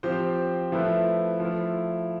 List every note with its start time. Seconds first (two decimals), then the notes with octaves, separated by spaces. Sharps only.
0.03 F3 C4 G4 C5
0.72 F3 A3 E4 B4
1.40 F3 A3 E4